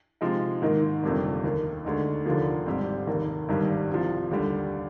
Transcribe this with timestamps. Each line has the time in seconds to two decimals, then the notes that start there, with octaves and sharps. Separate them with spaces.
0.21 C3 F3 G#3 D#4
0.62 G#2 D#3 A#3 D#4
1.03 G1 F2 C3 G3 A#3
1.44 D#2 D#3 A#3
1.85 D2 D3 G#3 D#4
2.25 F1 D#2 D3 F3 A#3
2.66 G#1 G#2 G3 C4
3.07 F1 D#2 D#3 A#3
3.49 G#1 G2 D#3 G3
3.89 C2 C3 F3
4.30 F1 D#2 D3 G3